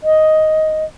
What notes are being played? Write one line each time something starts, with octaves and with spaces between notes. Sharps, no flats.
D#5